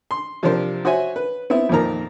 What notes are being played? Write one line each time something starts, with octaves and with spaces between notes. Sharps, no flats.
C6
C3 F3 D4 G4 A#4 C5
F#4 C5 C#5 E5 G#5
B4
B3 C4 E4 E5
F2 A#2 D#3 F3 A#4 A#5